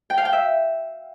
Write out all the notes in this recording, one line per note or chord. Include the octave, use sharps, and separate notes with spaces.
G5
F5
G5
E5